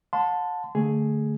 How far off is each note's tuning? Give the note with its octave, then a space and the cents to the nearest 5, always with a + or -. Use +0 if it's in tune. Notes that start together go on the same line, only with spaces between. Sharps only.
F#5 -45 A5 +0 C6 -30
D3 +0 A3 +0 G#4 +5